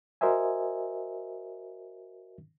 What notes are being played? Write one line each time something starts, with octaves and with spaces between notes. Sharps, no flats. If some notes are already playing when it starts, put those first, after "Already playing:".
F#4 A#4 C5 D#5 E5 G#5